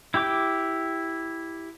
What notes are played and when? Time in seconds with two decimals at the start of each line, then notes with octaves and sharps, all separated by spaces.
0.14 E4 G4 G5 D6